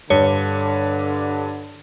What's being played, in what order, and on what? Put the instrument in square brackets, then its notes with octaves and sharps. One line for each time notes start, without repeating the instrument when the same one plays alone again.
[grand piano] G2 [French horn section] D3 [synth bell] C#5